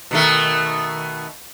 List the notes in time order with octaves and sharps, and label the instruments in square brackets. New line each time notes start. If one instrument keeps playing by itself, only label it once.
[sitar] B2 D#3 A3